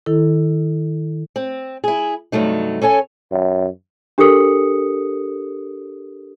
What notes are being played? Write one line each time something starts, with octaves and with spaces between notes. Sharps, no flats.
D#3 E4 A4
C4
E4 G#4
G2 C3 F#3 A3 D#4
C#4 A4 C#5 G#5
F#2
D4 G4 A4 A#4 D#6 C#7